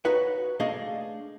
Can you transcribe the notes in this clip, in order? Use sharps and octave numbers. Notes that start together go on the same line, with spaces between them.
D#4 F#4 B4 C#5 F#5
A3 D4 G#4 D#5 F5